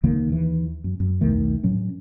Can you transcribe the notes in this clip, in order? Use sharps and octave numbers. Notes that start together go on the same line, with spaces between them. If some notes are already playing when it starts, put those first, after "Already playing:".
C#2 D3 D#3 A#3
D#2 E3
F#2
F#2
B1 E2 D#3 A3
A2 F#3 C#4